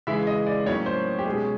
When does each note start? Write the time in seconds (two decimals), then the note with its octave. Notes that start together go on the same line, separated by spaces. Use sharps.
0.07 C#3 E3 G#3 E5
0.27 D#5
0.47 D5
0.66 A2 F#3 A#3 C#4 C#5
0.86 C5
1.19 G4
1.26 B2 G#3 C#4 G#4